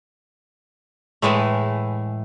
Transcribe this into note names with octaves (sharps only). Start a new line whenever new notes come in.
A2 E3 G#3 A3